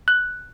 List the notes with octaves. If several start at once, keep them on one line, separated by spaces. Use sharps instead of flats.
F#6